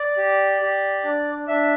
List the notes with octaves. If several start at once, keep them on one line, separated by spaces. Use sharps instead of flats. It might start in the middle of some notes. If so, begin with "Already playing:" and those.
Already playing: D5
G4
G4
D4
D4 E5